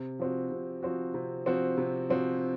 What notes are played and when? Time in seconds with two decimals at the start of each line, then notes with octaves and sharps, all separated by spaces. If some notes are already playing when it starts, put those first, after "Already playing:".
Already playing: C3
0.19 F3 C4 F#4
0.51 C3
0.83 F3 C4 F#4
1.14 C3
1.46 F3 C4 F#4
1.78 C3
2.10 F3 C4 F#4